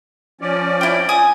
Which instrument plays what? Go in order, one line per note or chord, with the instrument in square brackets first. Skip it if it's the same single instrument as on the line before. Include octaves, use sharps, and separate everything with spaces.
[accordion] F3 C#4 D5
[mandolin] E4 G5
G#5 D#6